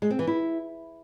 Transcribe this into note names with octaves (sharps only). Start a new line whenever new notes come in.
G#3
C4
E3
E4